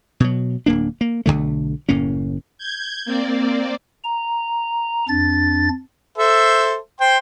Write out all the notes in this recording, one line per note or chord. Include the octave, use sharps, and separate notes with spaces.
B2 F#3
D1 A#3 D4
A#3
B1 F#2 D3 A3
F#1 A2 A#3 C#4
G6 G#6
A#3 C4 D5
A#5
F2 D4 A6
A4 C5 E5
C5 G5 C6